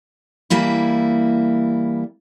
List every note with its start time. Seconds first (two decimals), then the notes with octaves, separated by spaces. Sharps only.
0.50 E3 G3 A#3 E4